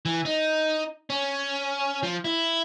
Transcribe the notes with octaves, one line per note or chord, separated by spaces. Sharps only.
E3
D#4
C#4
F3
E4